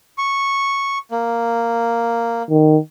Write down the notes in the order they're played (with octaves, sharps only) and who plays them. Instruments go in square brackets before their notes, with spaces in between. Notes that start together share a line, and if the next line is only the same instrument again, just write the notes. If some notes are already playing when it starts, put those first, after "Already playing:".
[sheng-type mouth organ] C#6
A#3
[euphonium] D#3